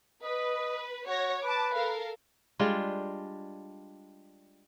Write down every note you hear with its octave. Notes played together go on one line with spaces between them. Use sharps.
B4 D#5
F#4 C#5 A#6
B4 A5 D6
A4 A#4 F5
G3 G#3 D4 F4